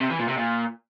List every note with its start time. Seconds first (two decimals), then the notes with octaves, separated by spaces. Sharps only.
0.01 C3
0.10 E3
0.19 A#2
0.28 C3
0.38 A#2